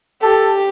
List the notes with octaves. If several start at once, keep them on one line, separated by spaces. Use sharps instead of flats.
G4 A4